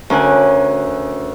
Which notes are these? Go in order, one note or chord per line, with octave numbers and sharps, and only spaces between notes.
D2 C#4 A#4 G#5 F#6